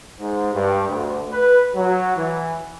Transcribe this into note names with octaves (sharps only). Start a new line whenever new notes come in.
G#2
G2
D2
B4
F#3
E3